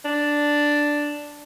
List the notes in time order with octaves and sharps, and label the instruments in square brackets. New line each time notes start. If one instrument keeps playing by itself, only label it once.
[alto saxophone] D4